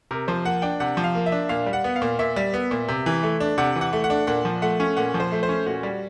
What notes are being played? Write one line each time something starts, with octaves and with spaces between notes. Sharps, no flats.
C3 A#4
F3 C5
A#3 F#5
D4 G5
C3 F#5
F3
F5
A#3
E5
D4
A#2 F5
G3
F#5
B3
F5
A#2
A#2 E5
G3
B3
A#2
C3
E3
A3
D4
C3 F#5
E3
F#5
A3
F#5
D4
A#2 F#5
F3
A3 F#5
C#4
A#2 F#5
F3
C5
A3
C5
C#4
A#2 F#4
G3